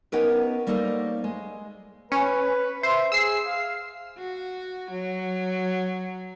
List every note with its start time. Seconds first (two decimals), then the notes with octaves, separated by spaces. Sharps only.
0.12 B3 C#4 D#4 G4 A#4 B4
0.67 G3 A#3 D#4 A4 C5 C#5
1.24 G#3
2.12 C#4 B4
2.83 C5 E5
3.12 G#4 E6 C7
3.46 F5
4.18 F#4
4.91 F#3